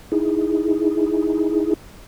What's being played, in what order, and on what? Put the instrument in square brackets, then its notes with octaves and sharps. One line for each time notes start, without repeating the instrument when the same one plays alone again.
[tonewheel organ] D#4 E4 G#4